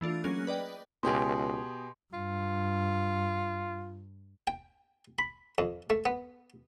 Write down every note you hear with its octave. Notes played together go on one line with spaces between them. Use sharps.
E3 A3 D4 F4
F#3 A#3 C#4 G#4 F#6
B4 D5 D#5 G5
C#2 B2 G4 G#4 C6
G2 F4
G5
B5
F2
A3
B3